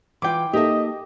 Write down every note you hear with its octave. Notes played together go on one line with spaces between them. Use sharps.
E3 F4 G5 D6
A#3 D#4 G4 A4 D#5 E5